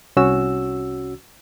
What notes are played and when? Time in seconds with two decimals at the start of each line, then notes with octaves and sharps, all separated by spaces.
0.16 C2 C#4 F#4 E6